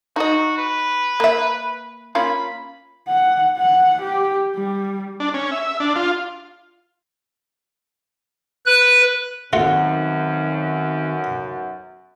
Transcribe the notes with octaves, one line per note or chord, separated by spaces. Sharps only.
D#4 F#4 D#5
B4
A#3 E5
A#3 C#4 F4 B5
F#5
F#5
G4
G3
D4
C#4
E5
D4
F4
B4 F#6
B1 F#2 D#3 A3 C4 F4 F#4 F#5